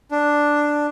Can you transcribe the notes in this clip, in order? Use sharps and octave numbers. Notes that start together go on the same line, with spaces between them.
D4